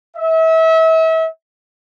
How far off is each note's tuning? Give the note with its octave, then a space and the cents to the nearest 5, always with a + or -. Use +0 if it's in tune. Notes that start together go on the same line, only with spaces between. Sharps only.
E5 -35